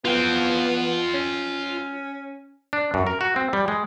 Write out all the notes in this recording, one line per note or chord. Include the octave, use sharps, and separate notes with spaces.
B3 F4 G5
C#4
D4
F#2
A#4
F#4
C4
G3
G#3